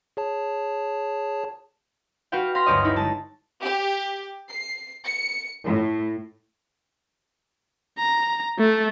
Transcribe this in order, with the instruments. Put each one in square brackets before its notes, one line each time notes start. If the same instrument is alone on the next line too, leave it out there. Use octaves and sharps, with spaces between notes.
[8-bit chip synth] G#4 C#5 A5
[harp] F#4 G4 B4 F5 G5
F5 C6 A#6 B6
G1 D2 G4 C#5 D#5
D#4 E4
G#3 A5
[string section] G4
C7
C#7
A2
[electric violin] A#5
A3